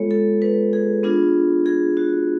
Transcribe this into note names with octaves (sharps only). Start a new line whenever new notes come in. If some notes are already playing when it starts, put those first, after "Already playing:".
Already playing: G#3 B3 F4 A4 C#5
A4
B4
G#4
B3 D4 F4 G#4
G#4
F#4